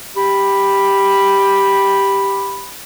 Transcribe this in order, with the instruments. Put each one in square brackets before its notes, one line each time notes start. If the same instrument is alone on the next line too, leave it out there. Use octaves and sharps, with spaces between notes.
[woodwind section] G4 B5